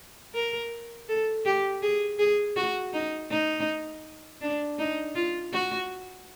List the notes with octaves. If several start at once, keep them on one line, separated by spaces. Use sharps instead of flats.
A#4
A4
G4
G#4
G#4
F#4
D#4
D#4
D4
D#4
F4
F#4